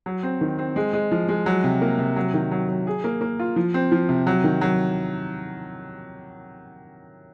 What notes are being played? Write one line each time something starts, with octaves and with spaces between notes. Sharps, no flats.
F#3
C4
D#3
C4
G#3
G#3
F3
G#3
F#3
C3
A#3
C3
F#3
D#3
F#3
F#3
G#4
A#3
A#3
F4
F3
C4
F3
C3
F#3
D#3
F#3